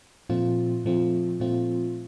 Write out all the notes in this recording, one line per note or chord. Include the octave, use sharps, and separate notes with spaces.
A#2 F3 A3 C4 F4
A#2 F3 A3 C4 F4
A#2 F3 A3 C4 F4